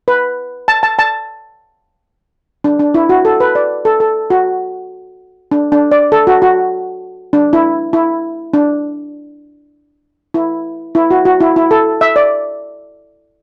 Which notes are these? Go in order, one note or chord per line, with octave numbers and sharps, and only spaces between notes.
B4
A5
A5
A5
D4
D4
E4
F#4
A4
B4
D5
A4
A4
F#4
D4
D4
D5
A4
F#4
F#4
D4
E4
E4
D4
E4
E4
F#4
F#4
E4
E4
A4
E5
D5